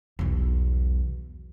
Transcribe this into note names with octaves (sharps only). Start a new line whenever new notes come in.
B1 E2